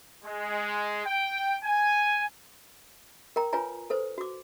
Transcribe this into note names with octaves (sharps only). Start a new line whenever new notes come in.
G#3
G5
G#5
A#4 G5 A#5
F4 B4 C#5 G#5 A#5
A4 B4 C5
F#4 D6